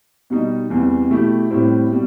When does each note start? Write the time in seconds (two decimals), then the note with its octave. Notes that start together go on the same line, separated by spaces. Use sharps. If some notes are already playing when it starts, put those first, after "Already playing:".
0.30 B2 G3 D#4
0.70 E2 C3 E3 G3
1.10 B2 A3 E4 G4
1.50 A2 G3 C4 E4 G4
1.91 B2 G3